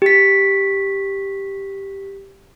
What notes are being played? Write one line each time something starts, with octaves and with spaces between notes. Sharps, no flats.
G4 B6